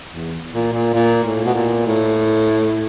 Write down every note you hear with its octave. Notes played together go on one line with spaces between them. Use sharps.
E2
A#2
A#2
A#2
A2
B2
A#2
A2